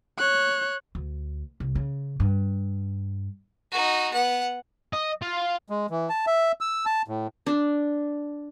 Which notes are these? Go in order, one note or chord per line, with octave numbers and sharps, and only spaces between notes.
C#5 F#6
D2
C2
C#3
G2
D#4 F#4
B3 F#5
D#5
F4
G#3
E3
A5
E5
E6
A5
A2
D4